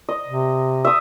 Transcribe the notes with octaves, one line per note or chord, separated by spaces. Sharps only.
D#5
C3
E5 D#6